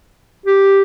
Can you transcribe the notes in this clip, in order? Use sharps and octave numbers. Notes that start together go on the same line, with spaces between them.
G4